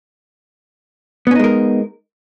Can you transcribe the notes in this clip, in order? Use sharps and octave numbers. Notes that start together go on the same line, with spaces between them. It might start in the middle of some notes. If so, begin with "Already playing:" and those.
G#3 B3 C#4 D#4 A#4